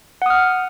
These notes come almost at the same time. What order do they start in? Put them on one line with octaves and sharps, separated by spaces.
F#5 D#6 F6